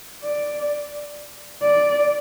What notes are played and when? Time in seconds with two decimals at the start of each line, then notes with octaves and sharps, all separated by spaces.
0.23 D5
1.62 D5